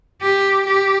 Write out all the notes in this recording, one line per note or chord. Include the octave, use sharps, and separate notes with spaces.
G4
G4